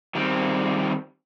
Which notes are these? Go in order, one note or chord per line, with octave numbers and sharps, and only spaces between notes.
D#3 G3 C4